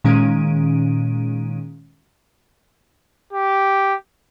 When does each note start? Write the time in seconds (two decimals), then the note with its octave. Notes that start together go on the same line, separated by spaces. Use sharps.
0.04 A#2 D#3 G#3 C#4 D7 D#7
3.33 G4